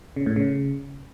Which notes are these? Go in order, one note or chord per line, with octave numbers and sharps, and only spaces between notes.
C#3
A2
C#3